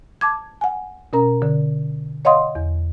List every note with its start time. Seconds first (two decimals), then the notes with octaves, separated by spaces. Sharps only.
0.21 A5 D6 G#6
0.61 F#5 G#5
1.13 B2 C#4 A#4 A#5
1.42 D3
2.25 C#5 D#5 F5 F#5 C6 D#6
2.55 E2